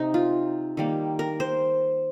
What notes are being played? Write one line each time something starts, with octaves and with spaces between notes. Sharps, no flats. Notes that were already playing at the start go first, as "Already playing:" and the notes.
Already playing: C3 D#4
F4
D#3 G3 A#3
A#4
C5